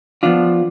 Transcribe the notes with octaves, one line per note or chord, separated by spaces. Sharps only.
F3 B3 D4 F4